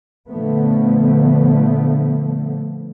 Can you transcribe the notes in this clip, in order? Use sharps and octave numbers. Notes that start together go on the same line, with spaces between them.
A#2 D3 F3 A3 B3